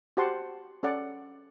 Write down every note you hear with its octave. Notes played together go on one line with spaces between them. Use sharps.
F#4 G4 C5 F#5 A5 C6
C#4 A4 D5 F#5